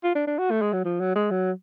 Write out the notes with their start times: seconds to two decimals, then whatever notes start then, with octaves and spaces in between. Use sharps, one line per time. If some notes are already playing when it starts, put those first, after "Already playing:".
0.04 F4
0.15 D4
0.27 D4
0.39 F#4
0.51 A3
0.62 G#3
0.73 F#3
0.85 F3
1.00 F#3
1.15 G#3
1.31 F#3